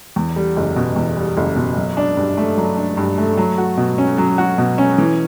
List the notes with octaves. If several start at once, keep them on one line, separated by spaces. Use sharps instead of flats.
E2
G3
F#1
B2
E2
G3
F#1
B2
F#3
D4
G2
A3
F#3
D4
G2
A3
F#3
F#4
B2
C#4
F#3
F#4
B2
C#4
E3